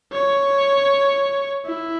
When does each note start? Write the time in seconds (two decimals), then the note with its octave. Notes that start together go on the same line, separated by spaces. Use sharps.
0.12 C#5
1.66 E4